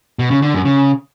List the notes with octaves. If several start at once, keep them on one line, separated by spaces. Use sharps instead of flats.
B2
C#3
D3
F#2
C#3